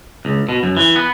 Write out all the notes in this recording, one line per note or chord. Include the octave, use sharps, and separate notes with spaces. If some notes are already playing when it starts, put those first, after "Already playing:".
C#2
B2
F#2
E3
B3